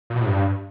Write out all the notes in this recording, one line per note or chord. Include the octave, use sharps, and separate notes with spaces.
A#2
B2
A2
G2